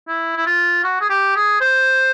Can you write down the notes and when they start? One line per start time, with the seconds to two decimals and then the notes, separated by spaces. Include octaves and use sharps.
0.08 E4
0.36 E4
0.46 F4
0.84 F#4
1.01 G#4
1.10 G4
1.36 G#4
1.61 C5